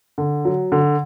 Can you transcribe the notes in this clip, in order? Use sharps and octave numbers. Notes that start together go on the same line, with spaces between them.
D3
F#3
D3